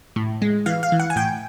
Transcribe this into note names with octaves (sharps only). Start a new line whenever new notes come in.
A2
G#3
E3 F5
F5
E3
F#5
G#5
A2 G5